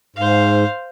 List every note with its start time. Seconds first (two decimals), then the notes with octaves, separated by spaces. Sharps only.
0.16 G#2 C5 F5